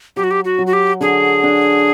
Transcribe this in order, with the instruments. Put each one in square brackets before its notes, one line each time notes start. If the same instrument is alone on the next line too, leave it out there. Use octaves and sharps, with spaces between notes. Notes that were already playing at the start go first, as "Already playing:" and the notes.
[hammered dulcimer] F#3 [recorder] G4
[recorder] F#4
G4
F#4
[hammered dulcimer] F#3
[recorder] F#4
G4
[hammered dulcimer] D3 [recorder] G#4
[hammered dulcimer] D4